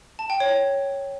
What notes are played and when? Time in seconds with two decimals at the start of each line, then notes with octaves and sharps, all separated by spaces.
0.19 A5
0.30 G5
0.40 C#5